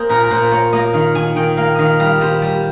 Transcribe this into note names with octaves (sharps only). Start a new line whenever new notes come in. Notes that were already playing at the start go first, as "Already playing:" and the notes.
Already playing: A#3 G#4 C5
A#2 A#4
A#4
A#2 C5
A#3 C#5
A#3 D#5
D#3 F5
D#3 G#5
D#3 G5
A#3 F5
D#3 D#5 F5
G3 F5
G3 C5
G3